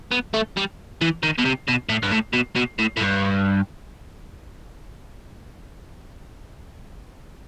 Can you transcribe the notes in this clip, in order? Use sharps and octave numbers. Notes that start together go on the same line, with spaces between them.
B3
A3
G3
E3
D#3
B2
C3
B2
A2
G2
A2
B2
B2
A2
A2
G2